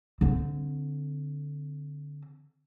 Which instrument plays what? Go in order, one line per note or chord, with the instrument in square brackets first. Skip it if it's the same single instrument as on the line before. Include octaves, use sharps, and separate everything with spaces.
[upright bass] D3 C4